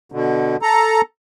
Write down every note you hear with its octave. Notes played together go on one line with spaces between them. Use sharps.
B2 D3
A4 A#5